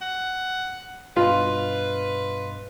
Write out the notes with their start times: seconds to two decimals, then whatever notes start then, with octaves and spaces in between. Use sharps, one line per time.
0.02 F#5
1.16 G2 B2 F4 B4 D#5